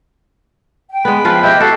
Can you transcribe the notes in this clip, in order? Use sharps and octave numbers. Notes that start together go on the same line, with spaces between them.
G5
G#3 B3 B5
F3 F4 B4
E4 G4 D#5 E5 G5
F#4 A4 F5